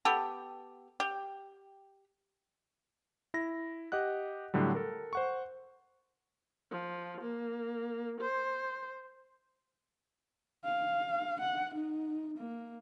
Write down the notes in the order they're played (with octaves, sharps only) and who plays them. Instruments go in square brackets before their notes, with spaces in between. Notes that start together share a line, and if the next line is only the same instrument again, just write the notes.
[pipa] B3 G4 A4
G4
[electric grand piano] E4 A#6
G4 D#5 F#5 F#6
A2 D3 F#3 G3
A4 A#4
C5 F#5 C#6
[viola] F3
A#3
C5
[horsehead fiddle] F5
F#5
D#4
A#3